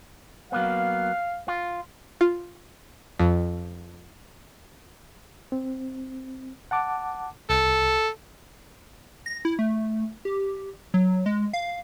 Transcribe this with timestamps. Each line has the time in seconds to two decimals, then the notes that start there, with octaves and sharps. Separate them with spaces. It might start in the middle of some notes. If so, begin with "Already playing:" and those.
0.52 F#3 A#3 B3 F5
1.48 F4
2.21 F4
3.19 F2
5.52 C4
6.71 F#5 A5 D6
7.50 C2 A4
9.26 A#6
9.45 E4
9.59 A3
10.25 G4
10.94 F#3
11.26 G#3
11.53 F5